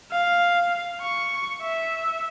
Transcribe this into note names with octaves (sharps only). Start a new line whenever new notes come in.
F5
C#6
E5